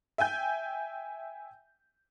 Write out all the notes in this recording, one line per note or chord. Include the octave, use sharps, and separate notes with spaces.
E5 G5 G#5 G6